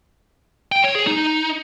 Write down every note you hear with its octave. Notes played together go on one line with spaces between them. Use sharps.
G5
C#5
G#4
D#4